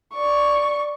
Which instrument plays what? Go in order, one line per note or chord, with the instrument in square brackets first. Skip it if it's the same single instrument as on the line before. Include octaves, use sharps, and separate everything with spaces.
[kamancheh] D5 C#6